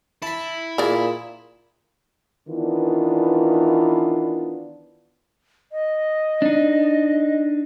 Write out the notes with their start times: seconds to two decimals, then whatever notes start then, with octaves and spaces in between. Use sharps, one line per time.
0.22 E4 A5 B5
0.78 A#2 G#4 A#4 D5
2.48 D#3 E3 B3 D4 F4
5.72 D#5
6.42 D4 D#4